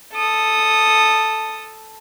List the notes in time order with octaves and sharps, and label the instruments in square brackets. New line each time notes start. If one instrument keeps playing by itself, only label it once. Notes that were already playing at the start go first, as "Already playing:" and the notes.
[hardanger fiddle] A4 D#6